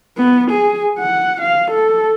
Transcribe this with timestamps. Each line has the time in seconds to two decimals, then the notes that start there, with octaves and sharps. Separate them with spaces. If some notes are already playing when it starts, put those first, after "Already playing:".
0.17 B3
0.51 G#4
0.98 F#5
1.41 F5
1.71 A4